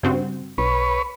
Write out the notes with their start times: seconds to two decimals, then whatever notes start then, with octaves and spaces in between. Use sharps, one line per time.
0.03 G2 C#3 C4 F#4
0.58 B1 B4 C#5